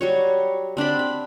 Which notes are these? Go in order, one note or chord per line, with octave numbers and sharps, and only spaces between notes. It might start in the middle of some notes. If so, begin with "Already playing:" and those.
F#3 G3 C#5
C4 D4 D5 B5
B5